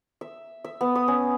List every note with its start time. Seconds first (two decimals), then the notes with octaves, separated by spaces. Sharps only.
0.21 E5
0.64 E5
0.81 B3
0.95 D#6
1.08 C#4